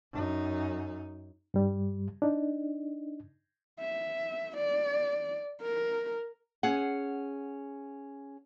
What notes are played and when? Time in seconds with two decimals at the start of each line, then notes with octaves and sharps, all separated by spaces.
0.12 F#2 D#4
1.54 G2 G3
2.22 D4 D#4
3.81 E5
4.57 D5
5.62 A#4
6.63 C#4 G#4 F#5